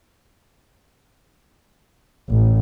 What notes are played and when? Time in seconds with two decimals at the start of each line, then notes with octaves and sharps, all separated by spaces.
2.28 A1